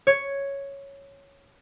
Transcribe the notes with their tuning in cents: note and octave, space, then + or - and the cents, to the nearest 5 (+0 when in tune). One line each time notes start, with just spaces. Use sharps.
C#5 +0